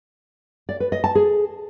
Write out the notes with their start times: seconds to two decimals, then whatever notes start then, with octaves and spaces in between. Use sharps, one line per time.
0.69 D5
0.80 B4
0.92 D#5
1.04 A5
1.15 G#4